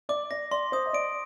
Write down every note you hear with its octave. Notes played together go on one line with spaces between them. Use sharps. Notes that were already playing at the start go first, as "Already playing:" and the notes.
D5 D6
D5 A#6
D5 C6
C5 D#6
D#5
D5 D7